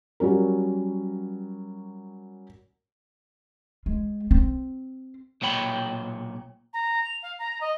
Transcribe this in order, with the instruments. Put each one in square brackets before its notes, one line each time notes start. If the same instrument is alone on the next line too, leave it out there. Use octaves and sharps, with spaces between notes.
[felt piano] F#3 G3 C#4 A#4
[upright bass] G#3
C4
[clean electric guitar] B1 A#2 C#5 G5 B5
[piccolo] A#5
F7
F5
A#5
D#5